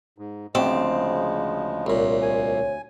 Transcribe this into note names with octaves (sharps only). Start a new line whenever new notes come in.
G#2
D2 C#3 F3 G#3 C4 A5
C2 A#2 C#5
G#5